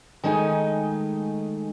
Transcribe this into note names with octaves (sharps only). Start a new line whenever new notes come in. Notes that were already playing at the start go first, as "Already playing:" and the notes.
D#3 G#3 A3 D#4 G#5